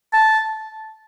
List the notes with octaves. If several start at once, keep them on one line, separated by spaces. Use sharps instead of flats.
A5